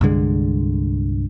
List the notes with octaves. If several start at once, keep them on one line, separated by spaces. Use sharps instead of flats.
C2 G2 D3 G#3